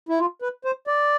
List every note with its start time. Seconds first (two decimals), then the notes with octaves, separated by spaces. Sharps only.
0.09 E4
0.19 F4
0.42 B4
0.64 C5
0.87 D5